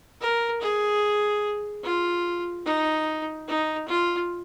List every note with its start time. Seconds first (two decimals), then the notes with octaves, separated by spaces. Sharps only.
0.21 A#4
0.61 G#4
1.83 F4
2.66 D#4
3.48 D#4
3.88 F4